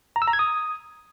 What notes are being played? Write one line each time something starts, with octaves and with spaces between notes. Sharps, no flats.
A#5
E6
A#5
G#6
D#6